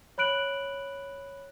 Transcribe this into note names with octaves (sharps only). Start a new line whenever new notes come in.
C#5 B5 F#6 D7 F#7